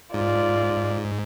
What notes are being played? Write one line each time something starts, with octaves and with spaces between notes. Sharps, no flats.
G#2 F4 D5